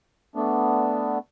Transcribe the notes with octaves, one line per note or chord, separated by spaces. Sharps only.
A3 B3 D4